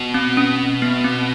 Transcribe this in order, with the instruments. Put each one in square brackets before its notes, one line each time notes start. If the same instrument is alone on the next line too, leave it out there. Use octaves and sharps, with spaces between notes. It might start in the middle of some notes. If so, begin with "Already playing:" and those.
Already playing: [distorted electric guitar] B2
[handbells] C4
C#4
B3
C4